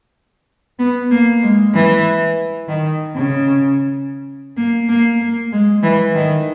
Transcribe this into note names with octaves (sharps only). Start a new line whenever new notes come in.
B3
A#3
G#3
E3
D#3
C#3
A#3
A#3
A#3
G#3
E3
D#3